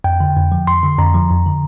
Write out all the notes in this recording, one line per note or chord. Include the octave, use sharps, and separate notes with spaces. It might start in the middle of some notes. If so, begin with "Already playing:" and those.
F2 G5
D3
F2
F3
F2 C6
D3
F2 A#5
F3
F2
D3